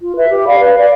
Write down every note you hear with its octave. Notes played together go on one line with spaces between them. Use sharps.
F4
B4 E5
G4
D5 F5 B5
B4
D5 F5